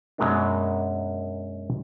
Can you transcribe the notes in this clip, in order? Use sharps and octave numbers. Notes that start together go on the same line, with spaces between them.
F#2 B2 F#3 G#3 A#3 D4